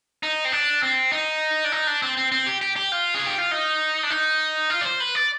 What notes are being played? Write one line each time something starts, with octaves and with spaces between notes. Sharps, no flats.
D#4
C4
D4
C4
D#4
D4
D#4
D4
C4
C4
C4
G4
G4
G4
F4
G#4
G4
F4
D#4
D4
D#4
F4
D5
C5
B4
D5